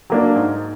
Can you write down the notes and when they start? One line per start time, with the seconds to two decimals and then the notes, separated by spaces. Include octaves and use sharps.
0.10 F#3 A#3 D4
0.35 G#2